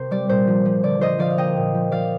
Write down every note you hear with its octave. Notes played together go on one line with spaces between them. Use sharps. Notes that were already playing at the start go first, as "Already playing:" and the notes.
Already playing: C3 A#3 C5
G3 D5
A#2 C5
F3
F3
D3 D5
F3 C5 D#5
F3 D5 F5
F5
A#3 D#5 G5
A#2
F3
F3 D5 F5